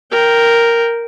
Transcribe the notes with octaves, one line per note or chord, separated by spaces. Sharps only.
A#4 G5